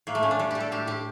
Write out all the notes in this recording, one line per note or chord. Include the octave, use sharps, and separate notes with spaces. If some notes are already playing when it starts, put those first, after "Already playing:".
A2 A#3
A3
A2 C#4
D4
G3
G3 G4
A4
A2 G4
A2 G4